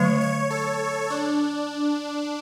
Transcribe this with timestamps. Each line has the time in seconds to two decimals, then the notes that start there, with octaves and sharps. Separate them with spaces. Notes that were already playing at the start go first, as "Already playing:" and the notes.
Already playing: D3 F#3 A3 C#5
0.21 C#5
0.51 A4
1.10 D4